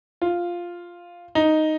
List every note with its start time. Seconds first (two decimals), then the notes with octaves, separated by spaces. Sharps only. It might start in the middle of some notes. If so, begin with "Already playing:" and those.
0.22 F4
1.35 D#4